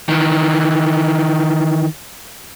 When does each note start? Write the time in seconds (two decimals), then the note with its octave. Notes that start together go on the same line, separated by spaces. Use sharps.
0.09 D#3 E3